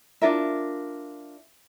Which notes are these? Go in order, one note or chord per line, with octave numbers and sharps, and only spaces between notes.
D4 F4 A#4 E5